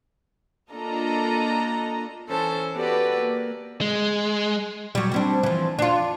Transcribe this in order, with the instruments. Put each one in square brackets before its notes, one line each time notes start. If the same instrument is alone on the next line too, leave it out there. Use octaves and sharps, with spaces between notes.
[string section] A#3 D4 F4 A4 D#5 A#5
[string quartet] E3 C#4 A4 C5 A5
B3 F#4 G4 A4 B4 D5
A#3
[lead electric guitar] G#3
[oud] F#3 G3
G3 C4 D4
E3 F3
D4 F4